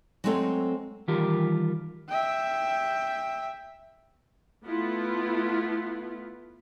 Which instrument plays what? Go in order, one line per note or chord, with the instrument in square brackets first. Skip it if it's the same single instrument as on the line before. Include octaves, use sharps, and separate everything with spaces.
[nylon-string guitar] F#3 G#3 A3 C4 A4 C#5
[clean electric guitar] D#3 E3 G3 F4 G4 A#4
[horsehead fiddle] E5 G5
[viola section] A3 B3 E4 F4